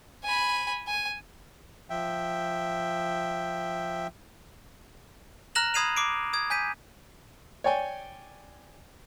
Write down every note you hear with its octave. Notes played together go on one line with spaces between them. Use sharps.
G#5 B5
G#5
F3 E5 G5
A#5 F6 F#6 A#6 E7 F#7
B5 D#6 G#6 C7 D#7 F7
D6 C7 D7
D#6 G#6
G#5 G6 B6 D#7
C#5 D5 G5 G#5